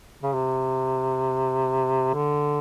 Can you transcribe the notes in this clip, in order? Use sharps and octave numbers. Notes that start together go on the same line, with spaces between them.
C#3
C3
D3